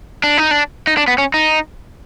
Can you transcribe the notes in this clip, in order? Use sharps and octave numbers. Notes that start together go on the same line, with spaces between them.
D4
D#4
D4
D#4
D4
B3
C#4
D#4